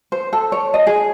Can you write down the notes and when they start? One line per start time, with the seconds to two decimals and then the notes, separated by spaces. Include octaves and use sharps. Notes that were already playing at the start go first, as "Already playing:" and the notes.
0.12 C5
0.33 A4
0.52 C#5
0.74 D#5
0.87 G#4